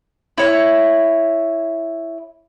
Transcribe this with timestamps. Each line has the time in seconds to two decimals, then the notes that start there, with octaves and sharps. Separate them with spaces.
0.38 E4 C#5